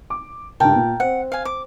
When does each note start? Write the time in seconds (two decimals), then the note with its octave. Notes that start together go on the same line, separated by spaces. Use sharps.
0.10 D6
0.60 C#2 G2 A#4 G5 A5
0.76 A#2
1.00 C4 F#5
1.32 F5 G#5
1.45 D6